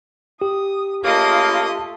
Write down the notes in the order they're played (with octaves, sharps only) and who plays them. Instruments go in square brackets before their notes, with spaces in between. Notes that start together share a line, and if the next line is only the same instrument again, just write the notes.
[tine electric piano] G4 [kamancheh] D#6
[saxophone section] C#3 A#3 [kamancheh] A3 F4 [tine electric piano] G4 [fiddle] D#5 D#6